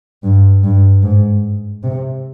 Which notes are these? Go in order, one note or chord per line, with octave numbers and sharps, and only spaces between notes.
G2
G2
G#2
C3